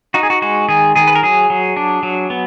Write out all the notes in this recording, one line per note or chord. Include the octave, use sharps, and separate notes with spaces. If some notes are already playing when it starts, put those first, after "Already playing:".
D#4 F#4
G#4
F#4
G#3 F#4
D#3 G#4
D#3 G#4
B4
A#4
F#3 G#4
F#3
D4
F#3
B3